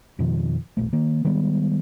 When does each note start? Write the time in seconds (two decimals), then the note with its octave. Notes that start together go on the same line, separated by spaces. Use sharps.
0.19 F2 B2 D#3 F3
0.77 E1 A#1 A3
0.93 D#3 A#3
1.25 D#3 G3 G#3 B3